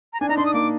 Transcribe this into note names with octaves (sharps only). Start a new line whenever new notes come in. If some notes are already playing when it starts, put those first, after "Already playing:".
A#5
D4 G#5
D#4 A#5
D4 C6
D#6
A#3 D6